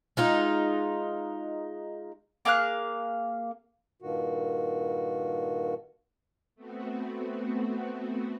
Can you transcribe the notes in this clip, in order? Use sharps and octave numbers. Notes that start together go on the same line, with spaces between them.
G#3 D#4 F4
A#3 G#4 F5 F#6
G2 A#2 D#3 F#4
A3 B3 C4 F#4